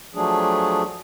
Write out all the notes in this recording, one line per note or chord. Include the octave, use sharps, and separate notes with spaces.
F3 F#3 A3 D4 G#4